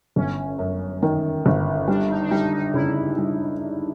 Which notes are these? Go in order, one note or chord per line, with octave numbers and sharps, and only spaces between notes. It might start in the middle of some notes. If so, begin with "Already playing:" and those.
G1 C#4
F#2
D#3
G1
G3 D4
D#4
D4
G3 D#4
D#4
C#3 E4
G3